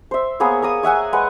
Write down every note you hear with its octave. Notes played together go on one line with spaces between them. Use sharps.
C5 E5
A#3 B3 G#4 C#5
A#3 A#5 D#6
C#5 E5 F#5 G#5
G#3 B4 F#5